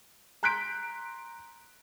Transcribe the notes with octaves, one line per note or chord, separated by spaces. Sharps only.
A#5 C6 F#6 G6 B6 D7